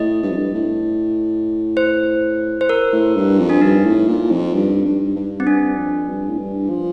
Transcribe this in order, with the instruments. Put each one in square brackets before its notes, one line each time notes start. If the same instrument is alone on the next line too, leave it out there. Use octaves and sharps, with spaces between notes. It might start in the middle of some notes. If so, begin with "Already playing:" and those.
Already playing: [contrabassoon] A2 [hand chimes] D#5
[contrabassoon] G2
F2
G2
A2
[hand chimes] C5
C5
A#4
[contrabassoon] A2
G2
F2
[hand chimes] D4
[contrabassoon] G2 [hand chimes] D#4
[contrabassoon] A2
A#2
F2
G2
G2
G2
[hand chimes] C4
[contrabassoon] G2 [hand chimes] D4
[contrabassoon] F2
G2
A2
G2
F3